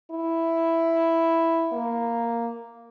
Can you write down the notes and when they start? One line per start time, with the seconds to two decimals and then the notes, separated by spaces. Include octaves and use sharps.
0.11 E4
1.72 A#3